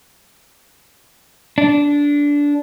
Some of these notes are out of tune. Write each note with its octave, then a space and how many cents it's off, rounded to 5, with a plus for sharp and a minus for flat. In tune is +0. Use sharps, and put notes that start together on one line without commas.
D4 -15